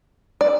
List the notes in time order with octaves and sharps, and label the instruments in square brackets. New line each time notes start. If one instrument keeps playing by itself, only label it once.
[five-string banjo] D5